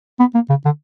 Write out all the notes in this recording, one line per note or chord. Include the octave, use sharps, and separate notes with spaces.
B3
A#3
C#3
D3